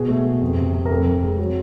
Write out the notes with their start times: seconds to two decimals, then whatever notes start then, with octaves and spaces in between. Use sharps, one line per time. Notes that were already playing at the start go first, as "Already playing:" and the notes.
Already playing: B2 G#4
0.09 A3
0.25 A3
0.41 F2
0.58 C3
0.73 C3
0.86 A#4
0.90 F2 A4
1.06 F2
1.23 G#3
1.38 F#3